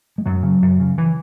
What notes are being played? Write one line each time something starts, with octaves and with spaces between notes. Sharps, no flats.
G#3
F#2 F#3
C#3
F#2
C#3
E3